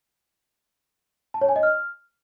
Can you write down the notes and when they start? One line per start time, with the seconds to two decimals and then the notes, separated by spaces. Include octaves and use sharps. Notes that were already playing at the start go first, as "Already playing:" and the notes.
1.34 A5
1.41 C#5
1.49 G#5
1.56 D#5
1.63 F6